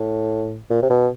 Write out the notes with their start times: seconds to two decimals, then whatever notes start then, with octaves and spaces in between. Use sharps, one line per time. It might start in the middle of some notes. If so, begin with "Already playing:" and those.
Already playing: A2
0.70 A#2
0.82 C3
0.90 B2